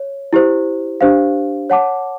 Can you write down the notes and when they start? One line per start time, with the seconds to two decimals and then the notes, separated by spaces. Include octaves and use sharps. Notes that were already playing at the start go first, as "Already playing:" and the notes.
Already playing: C#5
0.33 E4 G4 C5
1.01 D4 G4 C5 F5
1.70 C#5 F#5 A5 D6